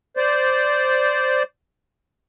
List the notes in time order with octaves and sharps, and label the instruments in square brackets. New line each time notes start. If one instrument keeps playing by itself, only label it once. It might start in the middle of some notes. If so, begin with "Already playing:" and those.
[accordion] C5 D5